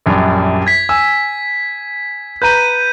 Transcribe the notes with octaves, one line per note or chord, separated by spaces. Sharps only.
A#1 F#2 G3
G#6 B6
G#5 E6
B4 A#5 G6 D#7